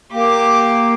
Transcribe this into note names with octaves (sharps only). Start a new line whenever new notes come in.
A#3 G4 D6